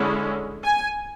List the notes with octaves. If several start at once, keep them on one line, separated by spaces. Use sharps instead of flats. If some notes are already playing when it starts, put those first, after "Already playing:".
Already playing: D3 G#3 C#4 E4
G#5